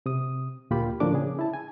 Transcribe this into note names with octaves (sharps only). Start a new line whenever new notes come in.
C3 D#6
D2 A#2 F4 G4 B5
A2 D3 F3 A#3 D4 D6
C#3 G#4
E4 A5
G#5